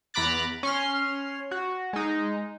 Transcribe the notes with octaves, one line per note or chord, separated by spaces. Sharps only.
E2 A#5 B5 D6 F#6 A6
C#4 C6 F6
F#4
G#3 D#4